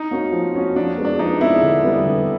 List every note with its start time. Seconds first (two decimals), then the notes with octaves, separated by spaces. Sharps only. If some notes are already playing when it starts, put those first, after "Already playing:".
Already playing: D#4
0.11 A#3 C#4 F#4
0.32 F3
0.54 A#3 C#4 F#4
0.76 F3 D4
0.98 G#3 B3
1.05 D4
1.19 F3 D#4
1.40 G#3 B3 E4
1.63 D3
1.84 G3 B3
2.06 D3